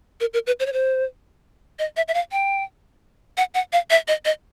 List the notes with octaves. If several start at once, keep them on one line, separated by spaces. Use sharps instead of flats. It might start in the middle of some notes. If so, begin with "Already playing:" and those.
A#4
A#4
B4
C5
C#5
C5
D#5
E5
E5
F5
G5
F#5
F#5
F5
E5
D#5
D#5